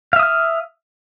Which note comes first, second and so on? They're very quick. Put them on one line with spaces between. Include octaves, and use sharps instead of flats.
F5 E5 D#6 F6